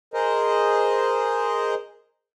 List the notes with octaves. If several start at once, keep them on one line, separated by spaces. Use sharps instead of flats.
G#4 A#4 C5 D#5